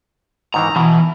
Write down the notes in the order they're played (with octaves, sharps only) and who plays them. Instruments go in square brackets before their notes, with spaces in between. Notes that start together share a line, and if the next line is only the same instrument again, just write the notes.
[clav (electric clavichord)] G#2 D#3 E3 [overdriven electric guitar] A#5
[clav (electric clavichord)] B2 [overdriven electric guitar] E3